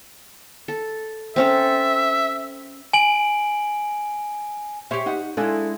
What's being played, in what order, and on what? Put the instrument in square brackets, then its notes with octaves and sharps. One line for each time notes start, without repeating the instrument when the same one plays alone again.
[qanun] A4
[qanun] C4 C#4 A4 [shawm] E5
[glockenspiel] G#5 D7 F#7
[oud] G4 C5 [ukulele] C#5 E5
[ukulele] D#4 F#5
[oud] G#3 [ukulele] D4 E4 [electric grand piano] A4 F5 G#5